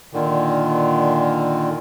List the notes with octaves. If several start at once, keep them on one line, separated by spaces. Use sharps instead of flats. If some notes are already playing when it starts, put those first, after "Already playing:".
A#2 D3 D#3